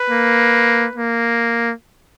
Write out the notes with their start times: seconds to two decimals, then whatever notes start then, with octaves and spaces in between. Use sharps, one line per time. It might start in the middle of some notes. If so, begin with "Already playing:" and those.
Already playing: B4
0.10 A#3
0.96 A#3